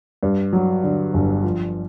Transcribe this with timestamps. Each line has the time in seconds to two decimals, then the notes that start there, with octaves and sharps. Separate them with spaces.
0.23 G2
0.53 F#3
0.84 D3
1.14 G1
1.44 F3